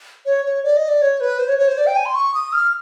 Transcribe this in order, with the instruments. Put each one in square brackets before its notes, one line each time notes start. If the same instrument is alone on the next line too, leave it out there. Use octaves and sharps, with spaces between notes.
[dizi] C#5
C#5
D5
D#5
D5
C#5
B4
C5
C#5
C#5
C5
D5
G5
G#5
C6
C#6
D#6
F6